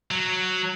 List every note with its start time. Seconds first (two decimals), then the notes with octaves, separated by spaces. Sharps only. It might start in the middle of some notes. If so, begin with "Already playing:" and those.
0.11 F#3